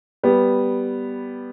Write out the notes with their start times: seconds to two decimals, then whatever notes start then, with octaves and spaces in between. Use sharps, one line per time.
0.23 G3 B3